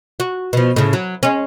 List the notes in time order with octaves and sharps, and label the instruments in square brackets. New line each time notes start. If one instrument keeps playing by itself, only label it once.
[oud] F#4
B2 F3
A2 C#3
F#3
G#3 C#4